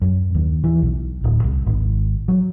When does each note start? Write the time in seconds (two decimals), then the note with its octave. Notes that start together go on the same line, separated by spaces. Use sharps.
0.02 F#2
0.35 D#2
0.64 E3
0.82 B1
1.24 D1
1.44 C2
1.67 G#1
2.28 F#3